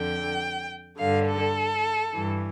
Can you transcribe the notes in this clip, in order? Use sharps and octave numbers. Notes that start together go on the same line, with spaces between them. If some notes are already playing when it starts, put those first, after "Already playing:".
Already playing: F2 D3 G5
G2 D3 F5
A4
G2 E3